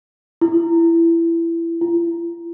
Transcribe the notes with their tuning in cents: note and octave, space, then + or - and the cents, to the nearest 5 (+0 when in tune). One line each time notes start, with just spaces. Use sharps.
E4 +20
E4 +45